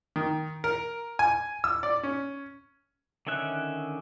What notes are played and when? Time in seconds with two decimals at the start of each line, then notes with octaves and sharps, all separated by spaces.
0.16 D#3
0.64 A#4
1.19 G#5
1.64 E6
1.83 D5
2.03 C#4
3.27 D3 D#3 C#4 E5 F#6